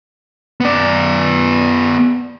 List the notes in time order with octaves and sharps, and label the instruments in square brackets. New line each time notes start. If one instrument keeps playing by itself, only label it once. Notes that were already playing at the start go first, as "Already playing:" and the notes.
[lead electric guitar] B3 D5